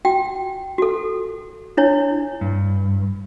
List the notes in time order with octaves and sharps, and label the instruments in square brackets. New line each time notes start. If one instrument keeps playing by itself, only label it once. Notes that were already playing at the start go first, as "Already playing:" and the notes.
[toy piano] F#4 G5
F#4 A4
D4 E4 C#5
[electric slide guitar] G2